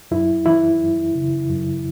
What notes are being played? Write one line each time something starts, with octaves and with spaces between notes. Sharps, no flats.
F#2 E4
E3 E4
F#2
C#3
F#2